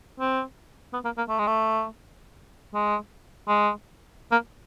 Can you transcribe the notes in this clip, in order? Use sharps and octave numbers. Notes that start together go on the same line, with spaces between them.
C4
B3
A#3
A#3
A3
G#3
A3
G#3
G#3
A#3